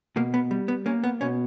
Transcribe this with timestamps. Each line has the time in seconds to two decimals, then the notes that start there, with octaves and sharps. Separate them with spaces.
0.16 B2 A#3
0.34 B3
0.51 G3
0.68 B3
0.86 A#3 C#4
1.04 B3
1.21 B2 C#4